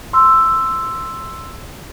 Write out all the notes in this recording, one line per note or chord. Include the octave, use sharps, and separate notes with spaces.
C6 E6